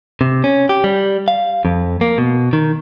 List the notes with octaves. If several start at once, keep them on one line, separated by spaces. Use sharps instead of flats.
C3
C#4
G4
G3
F5
F2
A#3
B2
D#3